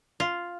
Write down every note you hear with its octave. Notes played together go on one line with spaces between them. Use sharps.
F4